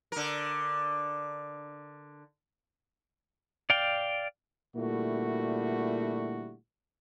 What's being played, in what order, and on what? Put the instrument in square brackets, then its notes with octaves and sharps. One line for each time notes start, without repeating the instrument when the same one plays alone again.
[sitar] D3 A#4
[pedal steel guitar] D5 F5 G5
[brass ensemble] A#2 D3 G3 A3 E4 F#4